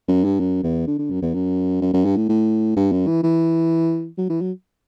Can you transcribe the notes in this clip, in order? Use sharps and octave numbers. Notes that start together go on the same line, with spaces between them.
F#2
G2
F#2
E2
D3
D3
F#2
E2
F#2
F#2
F#2
G2
A2
A2
G2
F#2
E3
E3
F#3
E3
F#3